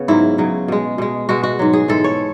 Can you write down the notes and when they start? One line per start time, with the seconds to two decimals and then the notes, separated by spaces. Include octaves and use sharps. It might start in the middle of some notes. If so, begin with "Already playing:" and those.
Already playing: C#3 B3 C#4
0.08 G#2 F#3 E4
0.38 C#3 F#3
0.68 B2 G#3
0.98 B2 G#3
1.29 B2 G#3 F#4
1.43 F#4
1.59 G#2 F#3
1.73 G#4
1.88 G#2 E3 G#3 A4
2.04 C#5